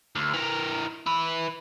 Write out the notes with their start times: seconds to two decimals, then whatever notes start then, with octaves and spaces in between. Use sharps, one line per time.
0.15 D2
0.34 E3 A#4
1.07 E4 B4